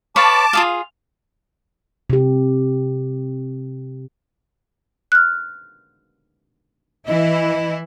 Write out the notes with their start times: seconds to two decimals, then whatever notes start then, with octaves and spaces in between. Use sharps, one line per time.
0.16 B4 C#5 F5 A5 D6
0.53 F4 G#4 F5
2.10 C3 G4
5.12 F6 F#6
7.07 E3 E4 D#5